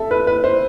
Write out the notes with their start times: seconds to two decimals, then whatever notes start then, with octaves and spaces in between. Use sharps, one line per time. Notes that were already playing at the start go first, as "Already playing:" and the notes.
Already playing: A4 E5
0.11 B4
0.27 B4
0.44 C5